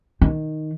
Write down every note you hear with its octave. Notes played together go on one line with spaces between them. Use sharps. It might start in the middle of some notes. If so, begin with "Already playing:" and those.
D#3